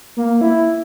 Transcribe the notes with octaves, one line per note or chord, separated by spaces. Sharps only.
A#3
E4